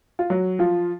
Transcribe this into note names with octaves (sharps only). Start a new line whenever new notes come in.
F4
F#3 F#4
F3 F4